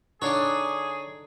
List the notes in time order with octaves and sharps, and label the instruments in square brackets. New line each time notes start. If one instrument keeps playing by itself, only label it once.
[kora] D3 D#4 [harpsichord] D4 C#5 [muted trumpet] G#4